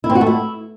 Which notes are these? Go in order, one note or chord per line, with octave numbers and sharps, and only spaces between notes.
E4
C4
F#4
A3
E4